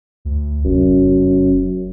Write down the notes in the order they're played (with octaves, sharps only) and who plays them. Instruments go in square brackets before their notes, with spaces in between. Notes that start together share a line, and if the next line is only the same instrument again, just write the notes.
[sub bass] D2
[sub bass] F1 [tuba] F#2